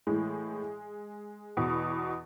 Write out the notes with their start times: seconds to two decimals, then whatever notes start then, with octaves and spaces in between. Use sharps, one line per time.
0.07 A2 E3 G#3
1.57 E2 B2